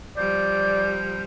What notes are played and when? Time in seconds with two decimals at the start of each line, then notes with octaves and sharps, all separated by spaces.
0.17 F3 G3 D5 G6